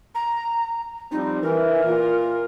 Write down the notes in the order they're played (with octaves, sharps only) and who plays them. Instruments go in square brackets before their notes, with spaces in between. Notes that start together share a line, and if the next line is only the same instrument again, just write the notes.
[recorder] A#5
[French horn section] F3 G3 C4 [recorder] D#4
[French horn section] E3 [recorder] A#4
[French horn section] A#2 F4